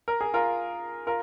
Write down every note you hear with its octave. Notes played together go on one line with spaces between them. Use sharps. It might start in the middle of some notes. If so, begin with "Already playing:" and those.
A#4
G#4
F4 A#4
F4 A#4